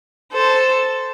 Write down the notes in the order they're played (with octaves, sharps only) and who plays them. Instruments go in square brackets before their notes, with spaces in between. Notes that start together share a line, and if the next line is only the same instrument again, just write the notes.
[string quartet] A4 C5